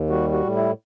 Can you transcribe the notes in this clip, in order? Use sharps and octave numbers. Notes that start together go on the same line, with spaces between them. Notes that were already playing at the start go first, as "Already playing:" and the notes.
Already playing: D#2
G3 F#4
F#4
A2
E4